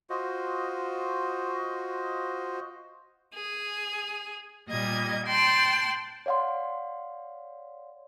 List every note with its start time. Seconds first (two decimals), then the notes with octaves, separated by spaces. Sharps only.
0.10 F4 F#4 C5 D#5
3.34 G#4
4.69 A#2 G3 D#5 G#6
5.26 G5 A5 C6 F#6
6.26 C#5 D5 F5 F#5 C6